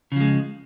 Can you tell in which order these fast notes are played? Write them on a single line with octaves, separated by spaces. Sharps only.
C#3 F3 G#3